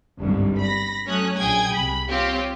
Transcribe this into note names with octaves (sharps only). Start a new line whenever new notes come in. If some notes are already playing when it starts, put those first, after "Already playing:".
G1 C2 G#2
B5 A#6
F#3 A3 C#4 C#5 D#6 F#6
A#1 G#4 G5 G#5 D#6 G#6
C2 B5
C4 F4 G4 C#5